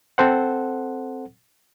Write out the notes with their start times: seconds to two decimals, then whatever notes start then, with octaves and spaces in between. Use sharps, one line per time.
0.18 C4 A4 C5 F#5